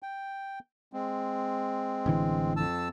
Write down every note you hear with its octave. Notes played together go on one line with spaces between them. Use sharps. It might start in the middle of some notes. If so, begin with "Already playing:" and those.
G5
G#3 C4
A1 D3 E3
F2 A5 E6